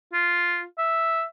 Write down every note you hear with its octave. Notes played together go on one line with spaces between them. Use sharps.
F4
E5